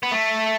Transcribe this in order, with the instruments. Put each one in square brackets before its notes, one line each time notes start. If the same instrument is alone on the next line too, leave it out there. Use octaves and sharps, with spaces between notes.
[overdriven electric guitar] B3
A3